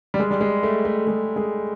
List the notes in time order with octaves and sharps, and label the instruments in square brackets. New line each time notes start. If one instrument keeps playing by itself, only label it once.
[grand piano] G3
G#3
G3
G#3
A3
A3
G#3
G#3